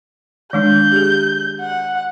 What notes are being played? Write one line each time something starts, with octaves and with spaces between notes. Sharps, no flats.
D#3 G#3 D4 G6
G4 G#4
F#5